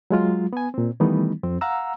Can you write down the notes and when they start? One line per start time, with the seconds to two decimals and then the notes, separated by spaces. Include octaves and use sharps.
0.10 F#3 G#3 F4
0.53 B3 G#5
0.74 A#2 C4
1.00 D#3 E3 G3 A3 B3 D#4
1.43 F2 C4
1.61 F5 F#5 A#5 E6